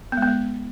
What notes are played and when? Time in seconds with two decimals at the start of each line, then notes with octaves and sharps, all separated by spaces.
0.12 B3
0.17 G#3
0.22 B3
0.28 G#3